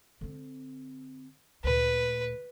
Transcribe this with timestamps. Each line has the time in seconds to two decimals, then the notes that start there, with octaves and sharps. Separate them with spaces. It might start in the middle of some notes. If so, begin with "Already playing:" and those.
0.21 D3 C4
1.64 D2 A#2 B4